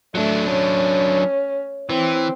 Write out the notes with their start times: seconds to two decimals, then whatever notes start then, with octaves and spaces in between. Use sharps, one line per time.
0.15 F#3 A3 D4
0.52 C#4
1.90 E3 C4